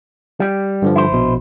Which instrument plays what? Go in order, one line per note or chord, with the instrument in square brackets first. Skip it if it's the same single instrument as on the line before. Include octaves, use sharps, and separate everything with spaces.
[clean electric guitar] G3 G4
[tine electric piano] G2 D3 F3
[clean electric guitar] E4 C5
[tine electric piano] A#1 B2